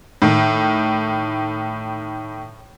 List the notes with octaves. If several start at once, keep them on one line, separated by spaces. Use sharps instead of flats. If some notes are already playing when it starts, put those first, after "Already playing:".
A2 D#3